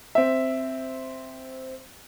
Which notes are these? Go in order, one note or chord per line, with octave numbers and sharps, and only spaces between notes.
C4 E5